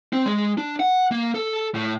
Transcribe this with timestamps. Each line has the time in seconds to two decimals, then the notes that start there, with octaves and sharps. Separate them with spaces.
0.13 C4
0.26 G#3
0.58 D4
0.80 F#5
1.11 A#3
1.34 A4
1.75 A2